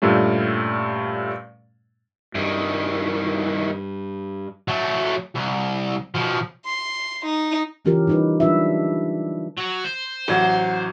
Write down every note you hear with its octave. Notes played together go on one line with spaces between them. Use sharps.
G2 A#2 G3 A3 C#4
C2 G2 D#3
F#3 A3
C2
B2 F3
C6
D#4
C#3 E3 C#4 F4 G4 A#4
G3 D#4 B4
F#3 G3 D4 F4 B4 E5
F#3 F#4
C5
A1 F#3 F#5